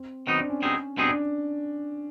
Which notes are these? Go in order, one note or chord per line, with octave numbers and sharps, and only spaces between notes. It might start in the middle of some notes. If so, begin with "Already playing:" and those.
Already playing: C4
D#3 F#3 B3 C4 D#4
D4
C#4
B2 G3 C4 D#4 G#4
B2 G3 C4 D4 D#4 G#4
D4